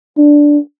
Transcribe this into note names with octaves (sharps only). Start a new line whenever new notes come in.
D4